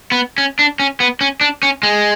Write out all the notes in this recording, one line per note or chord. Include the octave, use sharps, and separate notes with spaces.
B3
C#4
D4
C#4
B3
C#4
D4
C#4
G#3